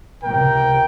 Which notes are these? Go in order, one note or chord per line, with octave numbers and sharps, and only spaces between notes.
C#2 C3 A#4 G5